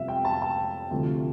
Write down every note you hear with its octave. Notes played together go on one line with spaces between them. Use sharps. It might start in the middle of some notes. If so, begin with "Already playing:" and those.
Already playing: F2 C3 G3 B3 E5 F5
G5
A5
A5
D2 C3 F3 A3